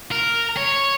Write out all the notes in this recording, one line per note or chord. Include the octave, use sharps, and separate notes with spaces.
A#4
C#5